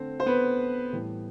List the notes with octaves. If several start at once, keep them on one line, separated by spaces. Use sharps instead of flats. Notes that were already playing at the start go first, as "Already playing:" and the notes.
Already playing: D3 A3 C4 C5
C5
B3 B4
A2 E3 G3